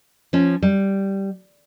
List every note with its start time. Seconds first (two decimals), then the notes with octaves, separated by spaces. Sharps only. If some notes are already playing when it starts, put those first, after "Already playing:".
0.33 F3 C#4
0.62 G3